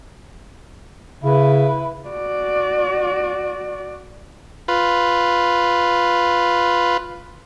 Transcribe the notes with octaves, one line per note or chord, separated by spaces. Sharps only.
C#3 E4 B4
F#4 D5
F4 B4